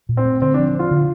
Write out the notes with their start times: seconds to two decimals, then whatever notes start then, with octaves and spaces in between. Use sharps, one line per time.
0.09 A#2
0.17 C4
0.25 A3
0.42 D3 C4
0.54 D4
0.58 F3
0.75 C4 F4
0.91 D3